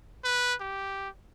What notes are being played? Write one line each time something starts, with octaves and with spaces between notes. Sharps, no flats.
B4
G4